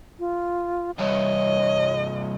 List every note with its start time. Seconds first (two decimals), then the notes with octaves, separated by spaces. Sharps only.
0.19 F4
0.99 C2 G2 C#5 D#5